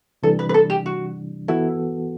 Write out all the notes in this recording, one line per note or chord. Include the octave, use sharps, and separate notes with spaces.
C3 E3 G3 D4 A4
B4
B4
A4
G4
F#4
E3 B3 E4 F#4 A4